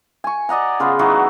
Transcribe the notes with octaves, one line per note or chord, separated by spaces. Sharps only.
G#5 C#6
D5 D#5 F#5 A#5
C#3 B3 F4 B4
E3 F#3 D#4 F#4